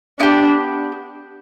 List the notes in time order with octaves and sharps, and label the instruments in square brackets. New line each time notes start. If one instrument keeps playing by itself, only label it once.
[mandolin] B3 E4 G4 [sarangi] D4